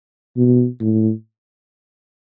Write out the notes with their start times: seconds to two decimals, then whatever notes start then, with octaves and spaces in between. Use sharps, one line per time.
0.37 B2
0.81 A2